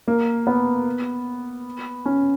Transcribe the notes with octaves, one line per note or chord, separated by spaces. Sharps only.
A#3
B3
C#4